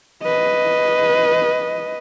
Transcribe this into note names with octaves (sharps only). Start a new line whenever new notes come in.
B4 D#5